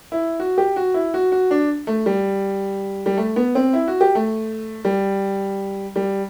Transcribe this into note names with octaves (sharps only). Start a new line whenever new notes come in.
E4
F#4
G4
F#4
E4
F#4
F#4
D4
A3
G3
G3
A3
B3
C4
E4
F#4
G4
A3
G3
G3